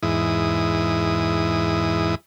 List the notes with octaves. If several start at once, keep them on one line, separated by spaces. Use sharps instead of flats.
E2 G#2 E4 D#6